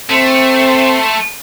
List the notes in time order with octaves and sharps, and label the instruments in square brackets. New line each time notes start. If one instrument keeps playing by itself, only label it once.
[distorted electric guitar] A3 [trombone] C4 [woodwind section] A4 C6